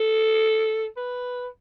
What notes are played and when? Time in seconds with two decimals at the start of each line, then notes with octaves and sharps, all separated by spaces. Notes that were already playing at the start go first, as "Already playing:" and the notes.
Already playing: A4
0.97 B4